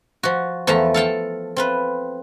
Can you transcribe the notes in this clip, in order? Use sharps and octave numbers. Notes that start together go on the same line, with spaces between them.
F3 F#4
E2 F3 A3 A5 A#5
A4 F5 G5 A5
C4 F4 B4